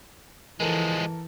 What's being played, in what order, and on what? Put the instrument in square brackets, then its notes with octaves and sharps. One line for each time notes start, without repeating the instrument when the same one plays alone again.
[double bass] E3 [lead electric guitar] F3 G#3 [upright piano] A4 A#4